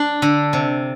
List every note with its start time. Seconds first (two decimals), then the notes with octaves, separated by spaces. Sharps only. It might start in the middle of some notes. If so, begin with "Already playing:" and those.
Already playing: D4
0.22 D3
0.53 C3